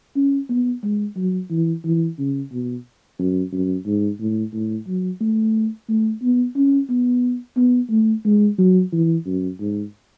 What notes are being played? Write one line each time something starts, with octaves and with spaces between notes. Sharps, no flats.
C#4
B3
G#3
F#3
E3
E3
C#3
B2
F#2
F#2
G#2
A2
A2
F#3
A3
A3
B3
C#4
B3
B3
A3
G#3
F#3
E3
F#2
G#2